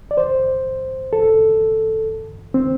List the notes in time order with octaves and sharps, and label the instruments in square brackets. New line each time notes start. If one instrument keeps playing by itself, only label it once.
[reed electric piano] D5
C5
A4
C4